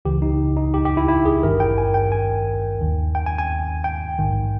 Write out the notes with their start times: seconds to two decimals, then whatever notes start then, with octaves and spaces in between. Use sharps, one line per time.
0.05 C#2 C#3 E3 G4
0.22 D#4
0.57 D#4
0.74 G4
0.85 G4
0.97 E4
1.08 E4
1.25 G#4
1.43 G#1 G2 D#3 A#4
1.60 G5
1.78 G#5
1.94 G5
2.12 G#5
2.81 D#2 D#3
3.15 G5
3.26 G#5
3.39 G#5
3.84 G5
4.19 A#1 G#2 D#3